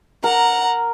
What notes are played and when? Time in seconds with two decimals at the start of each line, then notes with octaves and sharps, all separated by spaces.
0.24 A#4 F#5 A#5